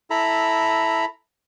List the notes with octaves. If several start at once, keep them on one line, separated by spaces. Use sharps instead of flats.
E4 A4 A#5 B5